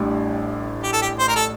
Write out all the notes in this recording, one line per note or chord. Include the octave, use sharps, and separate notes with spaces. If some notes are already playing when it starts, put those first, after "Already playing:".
Already playing: A1 A2 G3 D4 G4
G4
A4
G4
C5
A#4
A4